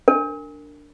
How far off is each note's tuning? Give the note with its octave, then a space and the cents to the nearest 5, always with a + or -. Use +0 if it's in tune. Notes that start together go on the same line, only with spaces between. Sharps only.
D4 +0 A#4 -20